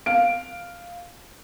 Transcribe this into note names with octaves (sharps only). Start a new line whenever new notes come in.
F5 D7